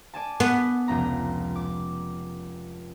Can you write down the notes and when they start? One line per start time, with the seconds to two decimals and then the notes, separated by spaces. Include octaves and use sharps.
0.14 D5 G#5 A5
0.40 B3
0.88 F1 C#2 A#5
1.56 D6